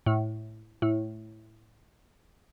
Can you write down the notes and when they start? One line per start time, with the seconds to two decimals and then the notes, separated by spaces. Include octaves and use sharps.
0.06 A2
0.82 A2